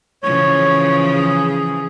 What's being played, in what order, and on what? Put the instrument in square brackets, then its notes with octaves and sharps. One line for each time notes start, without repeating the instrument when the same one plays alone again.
[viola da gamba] C#3 E3 F3 [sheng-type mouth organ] C#5
[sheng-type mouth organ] G#4
G#4